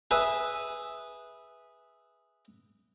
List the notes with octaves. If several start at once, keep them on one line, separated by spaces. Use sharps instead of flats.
G#4 B4 E5 G#5